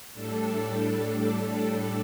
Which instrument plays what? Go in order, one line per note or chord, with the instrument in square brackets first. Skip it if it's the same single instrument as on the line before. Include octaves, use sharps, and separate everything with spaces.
[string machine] A2 G3 D4 A4